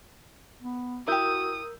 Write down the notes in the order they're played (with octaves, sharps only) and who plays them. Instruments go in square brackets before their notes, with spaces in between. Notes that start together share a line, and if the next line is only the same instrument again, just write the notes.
[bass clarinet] B3
[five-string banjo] E4 G4 [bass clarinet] F#4 [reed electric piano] A#4 E6 G6 [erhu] D#6